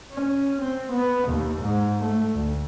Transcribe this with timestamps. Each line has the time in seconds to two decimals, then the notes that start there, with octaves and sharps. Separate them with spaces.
0.13 C#4
0.62 C4
0.92 B3
1.28 D#2
1.62 G#2
2.00 A3
2.35 D2